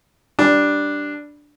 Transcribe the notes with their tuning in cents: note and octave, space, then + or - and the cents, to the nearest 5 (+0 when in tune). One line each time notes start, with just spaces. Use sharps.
G3 +0 D4 +0